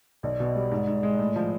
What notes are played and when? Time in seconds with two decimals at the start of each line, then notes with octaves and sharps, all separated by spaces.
0.23 B1 D5
0.40 B2
0.56 G3
0.71 G#2
0.87 G#2
1.03 G#3
1.19 A2
1.36 F3